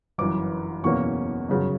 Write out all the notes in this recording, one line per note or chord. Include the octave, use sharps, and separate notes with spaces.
G1 F#2 E3 D6
F#1 E2 B2 A#3 C#4 C#6
G1 F#2 C#3 F#3